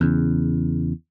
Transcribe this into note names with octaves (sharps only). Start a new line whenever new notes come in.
E2 C#3